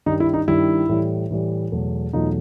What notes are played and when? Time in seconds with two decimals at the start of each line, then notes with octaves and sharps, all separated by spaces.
0.06 G2 D#3 G3 D#4
0.20 E4
0.34 D#4
0.48 G2 D#3 G3 E4
0.89 A2 E3 G3
1.30 A2 E3 G3
1.72 E2 B2 F#3 A3
2.13 E2 B2 F#3 A3 D#4 F4